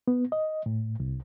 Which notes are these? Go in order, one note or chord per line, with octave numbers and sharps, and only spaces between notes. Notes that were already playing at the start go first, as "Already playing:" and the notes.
B3
D#5
A2
C2